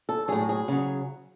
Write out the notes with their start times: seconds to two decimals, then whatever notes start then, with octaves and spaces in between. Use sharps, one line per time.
0.09 A4
0.28 A2 F#3 G#4
0.49 G#4
0.68 C#3 F#3